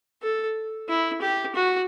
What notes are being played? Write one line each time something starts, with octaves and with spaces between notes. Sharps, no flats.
A4
E4
G4
F#4